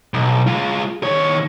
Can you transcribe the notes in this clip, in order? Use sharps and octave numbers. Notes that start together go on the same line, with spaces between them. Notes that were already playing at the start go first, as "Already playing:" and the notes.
B1
G#3 F4
D#3 C#5